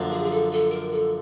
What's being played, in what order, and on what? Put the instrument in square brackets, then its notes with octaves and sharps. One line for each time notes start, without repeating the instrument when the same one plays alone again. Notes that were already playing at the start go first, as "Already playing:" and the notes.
Already playing: [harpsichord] F#2 D3 F3 A#3
[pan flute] G#4
G#4
A4
A4
A#4
A4